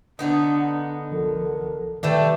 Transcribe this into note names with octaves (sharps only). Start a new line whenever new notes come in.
D3 B3 D4 D#4
C2 F3 A4 A#4
D#3 G3 A3 D4 B4